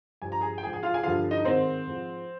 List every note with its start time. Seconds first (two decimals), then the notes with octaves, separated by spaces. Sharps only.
0.22 G2 F3 G#5
0.32 A#5
0.41 G#4 G#5
0.58 G5
0.63 F3 G#4 G#5
0.67 G#2
0.73 G#4 G#5
0.83 F4 F5
0.94 G#4 G#5
1.03 G2 D3 F3 F4 F5
1.31 D#4 D#5
1.45 G#2 D#3 C4 C5
1.87 G#2 F3